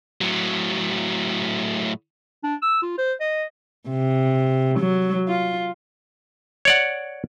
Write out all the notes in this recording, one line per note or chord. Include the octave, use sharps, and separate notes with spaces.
A2 F#3
D4
E6
F4
C5
D#5
C3
F#3
F4
C#5 D5 F#5